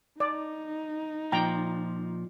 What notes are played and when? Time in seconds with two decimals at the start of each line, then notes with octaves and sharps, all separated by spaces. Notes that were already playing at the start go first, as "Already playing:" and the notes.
0.20 D#4 D5
1.32 A#2 F3 G5 A#5